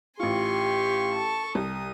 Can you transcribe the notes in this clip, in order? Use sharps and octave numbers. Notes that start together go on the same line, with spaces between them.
A1 F4 G4 G#5 C6 C#6
A4 A5
C2 D#6